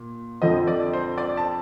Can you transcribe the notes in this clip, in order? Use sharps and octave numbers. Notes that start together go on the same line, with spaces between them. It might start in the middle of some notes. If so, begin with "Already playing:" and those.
Already playing: A#2
F2 D3 F3 C4 D#5
D5
C5
D5
A5